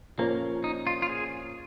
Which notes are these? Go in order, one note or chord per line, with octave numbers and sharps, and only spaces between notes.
A#2 F3 A#3 C#4 A#4 C#5
D#4
F4
F4
G#4